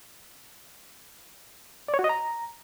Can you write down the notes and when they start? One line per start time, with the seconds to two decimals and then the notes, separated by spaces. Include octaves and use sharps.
1.88 D5
1.94 C#5
1.99 F#4
2.04 D#5
2.09 A#5